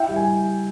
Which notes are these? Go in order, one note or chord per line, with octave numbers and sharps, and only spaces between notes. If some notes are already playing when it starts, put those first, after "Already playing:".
Already playing: E4 E5 G5
G3
G#5